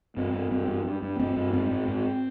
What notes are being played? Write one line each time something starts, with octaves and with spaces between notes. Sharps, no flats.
G2 C4
G2
G2 C4
G2
G2
G2
G2 C4
G2
G#2 C4
G#2
G#2